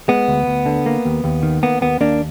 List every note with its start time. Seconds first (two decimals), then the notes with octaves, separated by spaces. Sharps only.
0.08 G#3 B3
0.28 D2
0.47 D2
0.66 D3
0.86 A#3
1.05 D#2
1.24 D#2
1.43 D#3
1.63 A#3 B3
1.81 D#2 B3
2.01 D#2 A#3 D4